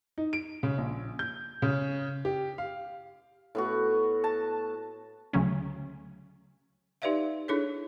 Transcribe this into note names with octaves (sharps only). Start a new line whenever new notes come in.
D#4
D7
C#3
A#1
G6
C#3
G4
F5
A2 B3 F#4
A5
D2 C#3 F#3 C#4
D#4 G4 B4 D5 E5 F5
D4 E4 G#4 A4 C#5